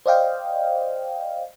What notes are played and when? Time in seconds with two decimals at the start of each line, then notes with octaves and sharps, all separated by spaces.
0.06 C5 D5 D#5 F5 G5